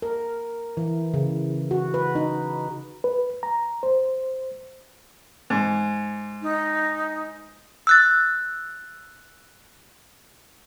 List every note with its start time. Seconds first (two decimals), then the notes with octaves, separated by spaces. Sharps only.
0.02 A#4
0.77 E3
1.14 C#3
1.71 F#4
1.94 B4
2.15 D#4
3.04 B4
3.43 A#5
3.83 C5
5.50 G#2
6.42 D#4
7.87 E6 F#6 A6